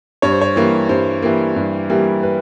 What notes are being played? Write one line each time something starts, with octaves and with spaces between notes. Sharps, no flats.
G2 C#5
C5
C#5
E3 G3 A#3
G2 C5
E3 G3 A#3
G2
E3 G3 A#3
B4